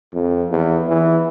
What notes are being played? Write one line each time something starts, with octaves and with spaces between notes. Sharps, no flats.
F2
E2
E3